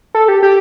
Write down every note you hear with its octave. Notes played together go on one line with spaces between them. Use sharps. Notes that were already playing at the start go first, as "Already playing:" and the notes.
A4
G4
G4